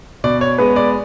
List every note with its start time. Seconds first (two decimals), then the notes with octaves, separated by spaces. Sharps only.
0.24 B2 D5
0.41 C#5
0.58 G#3 B3 B4
0.76 D5